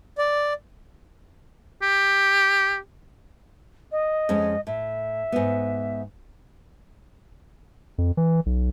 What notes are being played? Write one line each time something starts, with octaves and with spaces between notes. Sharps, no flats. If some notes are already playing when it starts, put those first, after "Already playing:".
D5
G4
D#5
F2 G#3 C#4
A2 E5
G#2 B3
F2
E3
B1